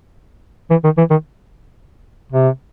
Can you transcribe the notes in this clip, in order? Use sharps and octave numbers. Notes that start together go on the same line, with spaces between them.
E3
D#3
E3
D#3
C3